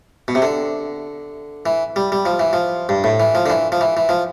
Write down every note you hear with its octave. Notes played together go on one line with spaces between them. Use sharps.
B2
C3
D3
E3
G3
G3
F3
E3
F3
G2
A2
E3
F3
D3
E3
F3
E3
E3
F3